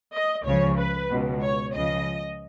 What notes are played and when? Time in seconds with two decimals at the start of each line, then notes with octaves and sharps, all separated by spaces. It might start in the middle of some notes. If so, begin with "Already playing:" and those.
0.13 D#5
0.45 C#2 C#3 F3 C#5
0.77 B4
1.10 C#2 B2
1.41 C#5
1.73 C#2 C#3 F3 D#5